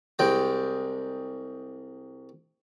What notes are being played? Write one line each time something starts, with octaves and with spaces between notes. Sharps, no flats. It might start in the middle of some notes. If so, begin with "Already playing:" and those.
C2 G#3 G5